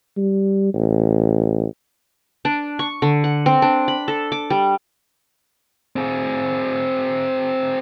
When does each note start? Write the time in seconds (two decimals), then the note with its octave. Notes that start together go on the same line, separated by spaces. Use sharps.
0.17 G3
0.74 A1
2.45 D4
2.79 C#6
3.02 D3
3.24 F#5
3.46 C4
3.62 D4
3.88 B5
4.08 A4
4.32 D6
4.50 G3
5.96 C4 G#4